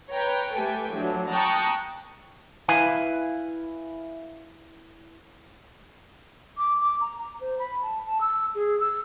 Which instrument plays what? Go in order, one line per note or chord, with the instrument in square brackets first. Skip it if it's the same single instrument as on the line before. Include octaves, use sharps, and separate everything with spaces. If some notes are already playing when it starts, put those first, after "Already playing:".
[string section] B4 C#5 G5 A#5
A3 G4 A4 B4 G5 G#5
A2 F3 F#3 D4
G5 A5 A#5 C#6 D#6 F#6
[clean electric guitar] E4 B4 F5 G#5
[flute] D6
D6
A#5
A#5
C5
B5
A5
A5
E6
G#4
E6